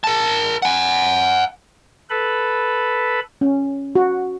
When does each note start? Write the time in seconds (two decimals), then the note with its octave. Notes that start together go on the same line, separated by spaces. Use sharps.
0.04 A#4 A5
0.62 F#5 G#5
2.10 A4 B4 B5
3.41 C#4
3.96 F#4